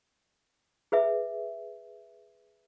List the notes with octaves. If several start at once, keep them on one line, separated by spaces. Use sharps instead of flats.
G#4 B4 E5